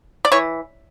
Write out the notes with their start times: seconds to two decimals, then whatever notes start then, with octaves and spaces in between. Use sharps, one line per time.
0.25 D5
0.32 E3 C#5